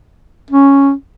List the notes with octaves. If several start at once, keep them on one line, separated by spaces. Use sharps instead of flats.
C#4